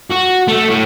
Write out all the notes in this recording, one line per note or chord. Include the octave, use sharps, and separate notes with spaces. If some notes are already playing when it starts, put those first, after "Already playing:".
F#4
A3
A2